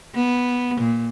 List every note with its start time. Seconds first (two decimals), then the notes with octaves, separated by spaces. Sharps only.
0.15 B3
0.81 A#2